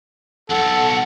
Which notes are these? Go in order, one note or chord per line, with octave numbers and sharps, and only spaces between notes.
B1 F2 A4 F#5